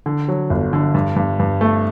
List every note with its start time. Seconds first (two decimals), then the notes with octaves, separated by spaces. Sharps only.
0.06 D3
0.28 F#3
0.50 G1
0.73 D3
0.94 G2
1.16 G2
1.39 G2
1.61 A3